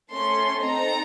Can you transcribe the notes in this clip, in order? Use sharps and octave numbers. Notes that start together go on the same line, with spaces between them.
A3 C#4 A4 C6
C4 D#4 A4 A#5